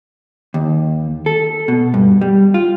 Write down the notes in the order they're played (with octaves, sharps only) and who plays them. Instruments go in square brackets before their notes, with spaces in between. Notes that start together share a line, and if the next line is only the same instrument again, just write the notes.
[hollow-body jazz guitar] D#2
A4
B2
G2
G3
F4